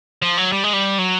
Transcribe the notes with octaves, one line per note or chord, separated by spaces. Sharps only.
F3
F#3
G3
G#3
G3
F#3